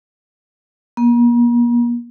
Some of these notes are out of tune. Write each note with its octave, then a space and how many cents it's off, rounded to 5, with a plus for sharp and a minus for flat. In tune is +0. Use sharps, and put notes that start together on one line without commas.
A#3 +40